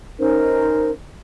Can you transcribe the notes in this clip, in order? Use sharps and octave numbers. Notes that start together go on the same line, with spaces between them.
C#4 D#4 A#4 C5